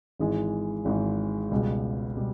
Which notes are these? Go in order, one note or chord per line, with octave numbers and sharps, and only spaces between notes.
G#1 G#2 E3 G#3
G#1 G#2 E3 G#3
C#2 B2 G3
B2 G3